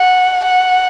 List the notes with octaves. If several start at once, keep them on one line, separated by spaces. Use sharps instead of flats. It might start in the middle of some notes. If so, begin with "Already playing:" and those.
Already playing: F#5
F#5